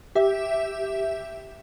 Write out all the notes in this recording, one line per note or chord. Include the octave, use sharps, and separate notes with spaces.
G4 E5